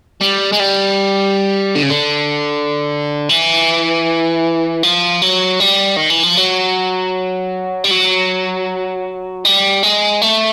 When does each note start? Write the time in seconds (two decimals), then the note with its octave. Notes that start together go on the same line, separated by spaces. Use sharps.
0.21 G3
0.53 G#3
0.60 G3
1.75 D3
1.83 C#3
1.90 D3
3.29 E3
4.83 F3
5.22 F#3
5.60 G3
5.96 D#3
6.10 E3
6.23 F3
6.37 F#3
7.84 G3
7.91 F#3
9.45 G3
9.83 G#3
10.22 A3